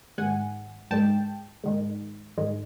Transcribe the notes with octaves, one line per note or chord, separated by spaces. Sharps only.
G#2 D#3 G#3 F#5 G#5
G#2 D#3 G#3 G5 A5
G#2 D#3 G#3
G#2 D#3 G#3